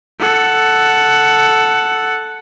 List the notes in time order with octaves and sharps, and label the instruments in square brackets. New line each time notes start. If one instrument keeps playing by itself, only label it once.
[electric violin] A4 F#5